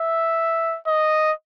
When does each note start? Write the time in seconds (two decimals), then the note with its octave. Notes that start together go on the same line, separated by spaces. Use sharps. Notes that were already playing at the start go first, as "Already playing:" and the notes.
Already playing: E5
0.87 D#5